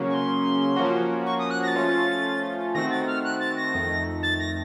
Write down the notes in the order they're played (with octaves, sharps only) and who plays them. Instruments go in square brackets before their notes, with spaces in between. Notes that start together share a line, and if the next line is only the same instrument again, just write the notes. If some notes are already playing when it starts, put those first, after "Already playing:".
Already playing: [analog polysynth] C#3 F#3 A#3 C#4
[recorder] C#6
C6
[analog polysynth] F3 A#3 C#4 F#4
[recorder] C#6
D#6
F#6
A#6
A6
[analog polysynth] F3 A3 C#4 F4
[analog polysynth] D#3 A3 C4 F#4 [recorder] A#6
[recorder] A6
F6
F#6
A6
A#6
[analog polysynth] F2 D#3 A3
[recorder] A6
A#6